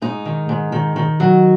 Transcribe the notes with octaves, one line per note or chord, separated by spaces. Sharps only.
G#2 D#4
D#3
G#2
D#3
D#3
F#3